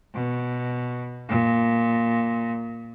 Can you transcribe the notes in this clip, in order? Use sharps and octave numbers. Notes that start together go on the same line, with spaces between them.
B2
A#2